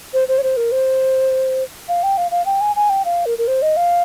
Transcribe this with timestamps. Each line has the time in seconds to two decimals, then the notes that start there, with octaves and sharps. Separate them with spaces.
0.13 C5
0.28 C5
0.38 C#5
0.43 C5
0.57 A#4
0.72 C5
1.88 F5
2.03 G5
2.17 F5
2.31 F5
2.46 G5
2.61 G#5
2.76 G#5
2.89 G5
3.05 F5
3.26 A#4
3.38 A#4
3.47 C5
3.62 D#5
3.77 F5